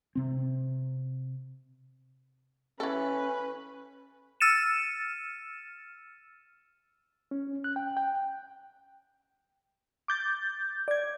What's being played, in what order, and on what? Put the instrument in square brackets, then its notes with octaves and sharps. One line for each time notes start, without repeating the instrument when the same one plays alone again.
[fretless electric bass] C3 C4
[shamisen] E3 A4 [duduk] C#4 [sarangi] B4
[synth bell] E6 F6 A6 C#7 D#7 E7
[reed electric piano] C#4
F#6
G5
G5
[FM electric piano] D6 G6 A6
D5 G#6